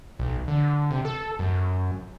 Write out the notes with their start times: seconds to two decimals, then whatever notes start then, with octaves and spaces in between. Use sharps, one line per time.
0.19 B1
0.48 D3
0.91 C3
1.05 A4
1.39 F#2